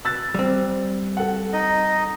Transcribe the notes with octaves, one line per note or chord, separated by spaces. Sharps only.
E6 F#6 A6
G3 C4
A4 F#5
D#4 D#5